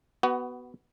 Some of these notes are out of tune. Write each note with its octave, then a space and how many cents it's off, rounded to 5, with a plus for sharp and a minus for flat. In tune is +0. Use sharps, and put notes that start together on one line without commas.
B3 +0 F#4 +25